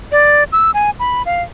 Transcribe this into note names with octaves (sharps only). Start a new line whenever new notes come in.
D5
E6
G#5
B5
F5